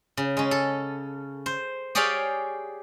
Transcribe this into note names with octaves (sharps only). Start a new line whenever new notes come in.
C#3
G#3 C#4
A4
C5
G4 G#4 C#5 D5 F5 G5